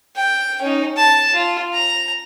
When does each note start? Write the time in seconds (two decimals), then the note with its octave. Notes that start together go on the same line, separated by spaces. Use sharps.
0.16 G5
0.62 C#4 D#4
0.96 A5
1.34 F4
1.73 A#5